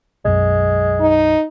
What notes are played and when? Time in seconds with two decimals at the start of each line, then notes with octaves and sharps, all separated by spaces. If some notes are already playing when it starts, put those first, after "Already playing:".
0.25 B1 F#2 G#3
1.00 D#4